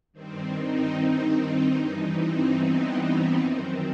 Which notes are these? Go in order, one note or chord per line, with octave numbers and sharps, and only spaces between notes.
G2 D#3 C4
D#4
D#4
G2 E3 D#4
C4
B3
F#2 D#3 C4